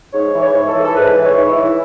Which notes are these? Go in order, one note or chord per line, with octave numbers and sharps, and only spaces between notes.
G#2 C#5
E3
C#5
G#2
A4
E3
A4
G#2 B4
E3
C#5
G#2
E4
E3